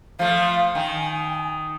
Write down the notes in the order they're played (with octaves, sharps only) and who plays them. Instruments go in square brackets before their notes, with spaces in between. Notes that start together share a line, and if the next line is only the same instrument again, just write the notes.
[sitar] F3 A3 [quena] F5
[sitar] D#3 [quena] G#5